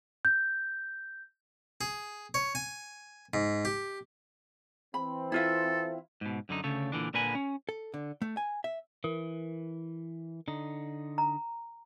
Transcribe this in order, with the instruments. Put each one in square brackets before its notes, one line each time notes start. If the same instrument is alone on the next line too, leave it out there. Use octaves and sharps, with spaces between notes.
[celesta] G6
[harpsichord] G#4
C#5
G#5
G#2
G4
[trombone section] E3 C4 [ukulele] B5
[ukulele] E4 F4 E5 [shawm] A4
[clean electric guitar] G#2 B2
F#2 D3 D#4
D2 C#3 A4 C#5
A#2 D3 E3 D4
A#2 D3 A#4 B4 G#5 B5
C#4
[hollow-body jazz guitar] A4
D3
A3
G#5
E5
[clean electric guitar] E3 [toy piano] A#4
[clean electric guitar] D3 D#4
[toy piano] A#5